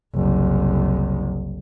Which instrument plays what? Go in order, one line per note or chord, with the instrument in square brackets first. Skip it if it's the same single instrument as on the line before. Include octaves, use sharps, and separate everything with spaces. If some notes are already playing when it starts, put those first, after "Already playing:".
[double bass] F#1 C2